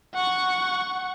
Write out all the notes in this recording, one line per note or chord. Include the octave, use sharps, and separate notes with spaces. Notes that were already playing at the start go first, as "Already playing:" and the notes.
F#5 C#6